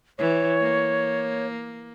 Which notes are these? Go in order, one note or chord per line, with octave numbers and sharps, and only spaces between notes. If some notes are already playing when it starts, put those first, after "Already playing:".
E3 C#5
A#3